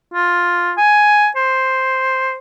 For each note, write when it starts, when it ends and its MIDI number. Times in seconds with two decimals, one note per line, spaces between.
0.14 0.72 65
0.77 1.28 80
1.36 2.37 72